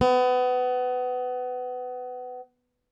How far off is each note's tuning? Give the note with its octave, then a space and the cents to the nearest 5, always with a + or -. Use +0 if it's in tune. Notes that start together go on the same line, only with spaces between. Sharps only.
B3 +25